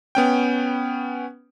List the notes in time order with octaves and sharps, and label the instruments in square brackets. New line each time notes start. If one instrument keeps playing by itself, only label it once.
[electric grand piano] B3 C#4 G5